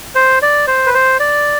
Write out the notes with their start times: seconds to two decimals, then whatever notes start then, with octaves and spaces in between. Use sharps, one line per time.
0.15 C5
0.42 D5
0.67 C5
0.86 B4
0.94 C5
1.20 D5